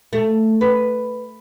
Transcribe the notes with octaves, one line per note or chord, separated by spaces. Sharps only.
A3
B4